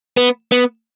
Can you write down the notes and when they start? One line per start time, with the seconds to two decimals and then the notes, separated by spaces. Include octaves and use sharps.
0.17 B3
0.52 B3